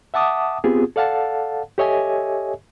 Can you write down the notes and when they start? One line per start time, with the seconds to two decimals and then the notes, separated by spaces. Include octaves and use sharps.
0.14 E5 F#5 A5 D6 D#6
0.64 B3 C4 F4 G4 G#4
0.96 A4 D5 F5 F#5 A5
1.78 G4 A4 C#5 D#5 E5 G#5